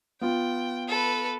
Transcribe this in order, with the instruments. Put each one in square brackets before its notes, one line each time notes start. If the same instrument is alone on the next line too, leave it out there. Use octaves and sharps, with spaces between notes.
[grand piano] B3 F4 [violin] G5
[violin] A4 B4